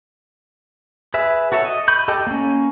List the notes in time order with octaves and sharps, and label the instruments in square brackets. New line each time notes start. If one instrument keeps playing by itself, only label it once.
[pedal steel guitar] G#4 B4 E5
F#4 A4 C#5 E5
D#5
B5 C#6 G6
G4 A4 D#5 G5 A5
A#3 C#4